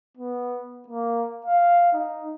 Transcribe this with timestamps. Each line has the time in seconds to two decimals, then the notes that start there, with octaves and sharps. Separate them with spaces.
0.17 B3
0.88 A#3
1.46 F5
1.93 D#4